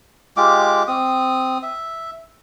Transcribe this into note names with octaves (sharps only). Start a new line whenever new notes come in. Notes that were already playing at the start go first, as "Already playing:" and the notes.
G#3 F4 G4 D6
C4 D#6
E5